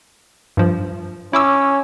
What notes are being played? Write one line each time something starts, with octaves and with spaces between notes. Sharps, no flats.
G2 F3
C#4 E4 D6 E6